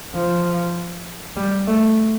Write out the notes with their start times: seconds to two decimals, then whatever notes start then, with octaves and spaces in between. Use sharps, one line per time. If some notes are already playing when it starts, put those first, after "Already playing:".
0.15 F3
1.36 G3
1.67 A3